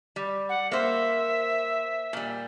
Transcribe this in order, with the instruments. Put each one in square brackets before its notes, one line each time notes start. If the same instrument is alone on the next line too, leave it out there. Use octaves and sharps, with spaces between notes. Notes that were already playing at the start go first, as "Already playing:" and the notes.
[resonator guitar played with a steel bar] G3
[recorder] F#5
[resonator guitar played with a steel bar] A#3 C5 [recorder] E5
[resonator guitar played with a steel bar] A#2 G3